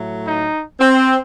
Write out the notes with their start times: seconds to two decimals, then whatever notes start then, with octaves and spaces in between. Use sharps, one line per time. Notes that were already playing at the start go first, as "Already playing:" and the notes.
Already playing: A2 F#3 A3
0.26 D#4
0.80 C4